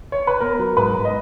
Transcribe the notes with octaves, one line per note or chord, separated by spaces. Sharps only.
C#5
B4
B3 A#4
F#3
G#2 B4
G#2
D#5